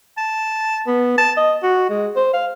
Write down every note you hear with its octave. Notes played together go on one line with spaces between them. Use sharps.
A5
B3
A5
D#5
F#4
G#3
C5
F5